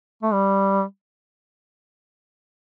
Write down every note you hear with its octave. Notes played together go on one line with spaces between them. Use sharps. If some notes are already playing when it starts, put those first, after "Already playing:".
A3
G3